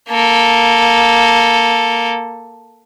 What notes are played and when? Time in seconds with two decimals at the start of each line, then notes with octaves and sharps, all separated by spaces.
0.10 A#3 A4